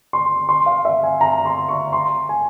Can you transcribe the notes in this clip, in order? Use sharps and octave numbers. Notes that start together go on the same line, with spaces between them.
C6
C6
F5
E5
G#5
A#5
C6
C#6
C6
G#5